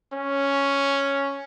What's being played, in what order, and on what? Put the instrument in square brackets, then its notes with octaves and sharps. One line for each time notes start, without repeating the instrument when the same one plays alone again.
[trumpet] C#4